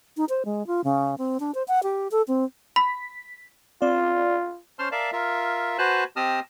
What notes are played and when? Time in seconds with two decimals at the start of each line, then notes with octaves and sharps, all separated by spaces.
0.17 D#4
0.29 C5
0.45 G#3
0.67 F4
0.84 C#3
1.18 C4
1.40 D4
1.55 C5
1.68 F#5
1.83 G4
2.11 A4
2.28 C4
2.76 B5 B6
3.82 C4 F4 D5
4.79 C#4 C5 A5 C6 F6
4.92 A#4 D5 E5 F5 A5
5.13 F4 A#4 E5
5.78 F#4 B4 C5 G#5 A5 F#6
6.16 C4 G4 D#5 A5 D#6 F6